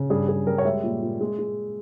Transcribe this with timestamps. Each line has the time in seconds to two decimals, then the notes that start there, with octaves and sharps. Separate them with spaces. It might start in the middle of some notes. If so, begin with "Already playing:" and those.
Already playing: C#3
0.10 G2 G#4
0.28 G2 G#4
0.47 G3 A#4
0.58 C#5
0.65 G#3 E5
0.83 A#2
1.02 A#2
1.21 G#3
1.39 G#3